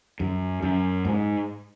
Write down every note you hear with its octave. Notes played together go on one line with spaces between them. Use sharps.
F#2
F#2
G#2